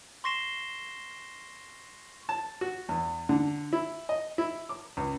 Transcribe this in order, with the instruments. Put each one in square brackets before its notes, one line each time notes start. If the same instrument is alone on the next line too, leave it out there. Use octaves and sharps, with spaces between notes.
[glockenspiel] C6 C#6 A#6 C7 E7 G7
[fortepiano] A5
F#4
E2
D3
E4
D#5
E4
D6
C#2